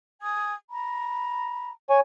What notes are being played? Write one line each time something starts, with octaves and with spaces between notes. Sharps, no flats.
G#5 D#6 G#6
A#5 B5
C#5 G#5